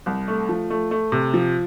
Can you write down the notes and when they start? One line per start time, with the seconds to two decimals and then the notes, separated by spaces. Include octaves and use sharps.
0.06 C2
0.28 A3
0.49 F3
0.70 A3
0.91 A3
1.12 C3
1.34 F3